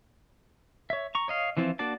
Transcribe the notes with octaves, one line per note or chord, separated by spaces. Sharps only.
C#5 E5
A#5 C#6
C#5 D#5 F5
E3 F3 C4 E4 F4
A#3 D4 F#4 D5 A5